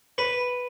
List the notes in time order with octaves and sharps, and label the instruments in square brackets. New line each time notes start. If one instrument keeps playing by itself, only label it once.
[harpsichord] B4